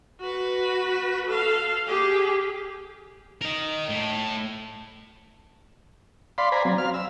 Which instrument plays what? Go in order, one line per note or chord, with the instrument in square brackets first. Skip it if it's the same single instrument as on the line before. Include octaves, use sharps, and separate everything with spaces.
[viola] F#4 B4
A4 F5
G4 G#4
[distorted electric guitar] A#4 D#5
A2
[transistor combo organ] D5 F5 B5 C6
C5 D5 G#5 A#5 B5
F#3 C4
F5 F6
E6